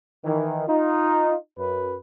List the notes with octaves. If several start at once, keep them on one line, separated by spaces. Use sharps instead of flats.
D#3 E3
D#4 F4
F#2 B4